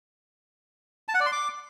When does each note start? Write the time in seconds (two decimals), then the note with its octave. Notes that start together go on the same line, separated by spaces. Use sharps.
1.08 A5
1.14 F#5
1.20 D5
1.26 C6
1.32 D6